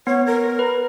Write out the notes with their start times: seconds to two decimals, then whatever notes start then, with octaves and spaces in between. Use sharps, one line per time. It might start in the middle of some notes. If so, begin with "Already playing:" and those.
0.07 B3 C#5
0.26 A#4
0.59 B4